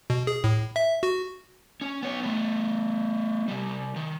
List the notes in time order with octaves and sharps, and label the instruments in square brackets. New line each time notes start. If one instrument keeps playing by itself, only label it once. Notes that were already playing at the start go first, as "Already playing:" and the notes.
[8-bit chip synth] B2
G#4
A2
E5
F#4
[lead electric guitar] C#4
B3 C#5
A3 B3
C3 G3
D#3